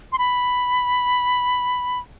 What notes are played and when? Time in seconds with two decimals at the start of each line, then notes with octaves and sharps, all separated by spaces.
0.12 C6
0.18 B5